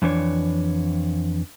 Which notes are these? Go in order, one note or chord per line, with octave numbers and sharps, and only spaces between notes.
F2 E3 D4 C#5